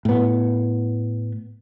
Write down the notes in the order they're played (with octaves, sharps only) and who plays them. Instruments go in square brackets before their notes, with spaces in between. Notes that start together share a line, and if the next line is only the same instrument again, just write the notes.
[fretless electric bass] A2 B3